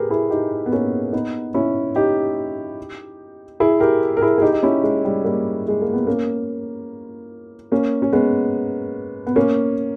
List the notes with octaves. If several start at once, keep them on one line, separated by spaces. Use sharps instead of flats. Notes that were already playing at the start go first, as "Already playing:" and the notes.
Already playing: G4 G#4 A#4 B4
E4 G#4
D#4 G4
B3
A#3 C#4
B3 D#4
C#4 E4
D#4 G4
E4 G#4
G4 A#4
A#4
E4 G#4
G#4
D#4 G4
D#4
C#4 E4
G#3
G3
G3 A#3
G#3
A#3
B3
A#3 C#4
A#3 C#4
C#4
G#3 B3
B3
A#3 C#4